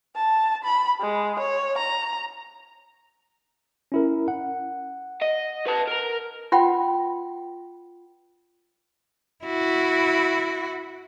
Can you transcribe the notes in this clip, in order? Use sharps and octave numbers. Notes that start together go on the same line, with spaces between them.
A5
B5
G#3
C#5
A#5
C#4 E4 A#4
F#5
D#5
B4 A5
A#4 A#5
F4 B4 F#5 G5 B5 C6
E4 F#4